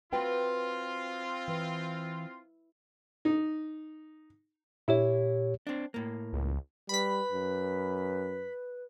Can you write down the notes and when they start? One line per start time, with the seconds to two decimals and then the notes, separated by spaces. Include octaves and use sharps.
0.13 C4 F4 F#4 B4 G5
1.48 E3
3.25 D#4
4.88 A#2 E4 G4 C#5
5.67 C4 D4
5.94 A2 A#3
6.33 C#2
6.89 G3 B4 B5 B6
7.32 F#2